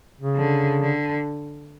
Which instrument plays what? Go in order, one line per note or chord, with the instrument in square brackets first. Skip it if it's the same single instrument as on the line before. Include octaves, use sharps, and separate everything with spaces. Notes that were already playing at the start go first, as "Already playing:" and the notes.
[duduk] C#3
[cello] D3
D3